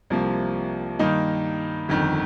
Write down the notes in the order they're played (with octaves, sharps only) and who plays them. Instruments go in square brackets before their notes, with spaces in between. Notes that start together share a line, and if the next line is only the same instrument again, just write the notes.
[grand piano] C2 C3 F3 A#3
G2 D#3 A#3 D#4
G1 F2 D#3